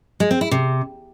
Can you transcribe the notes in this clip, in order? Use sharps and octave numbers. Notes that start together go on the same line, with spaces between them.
G#3
C4
E4
C3